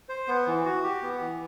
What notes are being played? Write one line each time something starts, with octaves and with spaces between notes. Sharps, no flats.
C5
B3
E3
F#4
G4
B3
E3